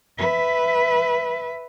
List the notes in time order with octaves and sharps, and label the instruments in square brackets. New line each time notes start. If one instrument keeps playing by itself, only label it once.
[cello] B4 E5